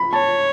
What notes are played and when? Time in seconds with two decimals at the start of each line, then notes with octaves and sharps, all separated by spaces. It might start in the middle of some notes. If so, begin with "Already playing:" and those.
Already playing: B5
0.13 C#5 A5